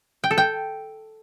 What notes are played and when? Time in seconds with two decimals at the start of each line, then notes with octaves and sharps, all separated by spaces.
0.24 G5
0.31 A4
0.38 G5